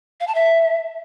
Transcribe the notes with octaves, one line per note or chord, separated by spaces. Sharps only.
F5
A5
E5